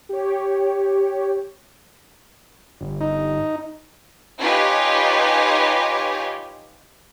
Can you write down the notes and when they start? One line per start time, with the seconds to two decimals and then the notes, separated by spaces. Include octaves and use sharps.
0.09 G4 C#5
2.81 G1
3.01 D#4
4.39 D#4 F4 G4 B4 C#5 G#5